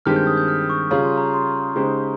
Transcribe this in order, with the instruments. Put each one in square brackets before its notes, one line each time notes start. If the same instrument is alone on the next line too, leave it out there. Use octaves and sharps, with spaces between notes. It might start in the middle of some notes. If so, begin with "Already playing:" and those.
[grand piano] G2 D#3 G#3 C4 G4 [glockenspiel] F6
[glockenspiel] G6
D#6
G6
F6
C#6
[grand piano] C#3 G3 C#4 F4 G#4 [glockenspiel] A#5
[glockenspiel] C6
A#5
C6
[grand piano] C#3 G#3 D#4 G4 C5